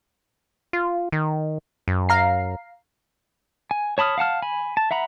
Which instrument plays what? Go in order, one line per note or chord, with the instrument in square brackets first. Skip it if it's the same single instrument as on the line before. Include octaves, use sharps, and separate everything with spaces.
[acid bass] F4
D#3
F#2
[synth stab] F5 A#5 C7
[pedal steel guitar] G#5
C#5 A5 B5 D#6 F6
F5 F#5 A5 F6
G#5 B5
A5
E5 F#5 A#5 B5